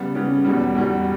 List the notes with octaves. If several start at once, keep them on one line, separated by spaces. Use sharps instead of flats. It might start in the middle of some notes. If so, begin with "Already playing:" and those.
Already playing: C#3 G3 B3
C#3 G3 B3
E2 B2 G3
E2 B2 G3